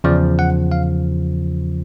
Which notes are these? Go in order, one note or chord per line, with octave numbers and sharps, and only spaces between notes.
E2 C#3 F3 D5
F#5
F5